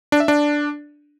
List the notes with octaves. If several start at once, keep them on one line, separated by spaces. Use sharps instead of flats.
D4
E5
D4